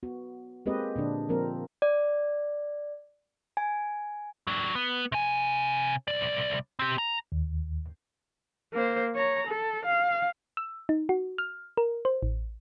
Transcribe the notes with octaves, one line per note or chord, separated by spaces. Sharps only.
B3 F#4
G#3 A#3 C4 G4 B4 D#5
A#2 D3 D4
F3 A#3 C4 A#4
D5
G#5
F#3 D4
B3
C3 G#5
C2 D5
C4 G4
A#5
D#2
A#3 C5
C#5 A#5
A4
F5
E6
D#4
F#4
F6
A#4
C5
A1